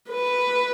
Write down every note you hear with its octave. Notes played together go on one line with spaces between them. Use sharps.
B4